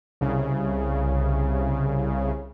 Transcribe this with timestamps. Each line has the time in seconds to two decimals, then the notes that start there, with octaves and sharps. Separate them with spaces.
0.21 C2 C#3